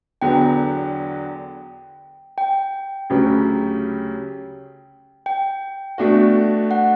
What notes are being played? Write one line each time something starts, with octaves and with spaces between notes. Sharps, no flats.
E2 D3 F#3 B3 G5
G5
D2 C#3 F#3 C#4 G4
G5
B2 A3 D4 F#4
F#5